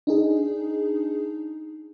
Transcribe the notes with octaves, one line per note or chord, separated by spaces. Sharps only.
D4 D#4 G#4